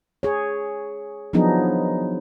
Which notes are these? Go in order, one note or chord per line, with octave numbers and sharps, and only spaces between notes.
G#4 C#5
F3 F#3 B3 D4 D#4 G#4